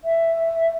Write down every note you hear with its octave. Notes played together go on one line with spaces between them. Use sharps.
E5